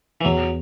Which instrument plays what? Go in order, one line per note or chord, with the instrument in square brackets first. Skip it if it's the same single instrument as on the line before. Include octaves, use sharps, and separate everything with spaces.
[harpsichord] E3
[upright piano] E2 [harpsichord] F#3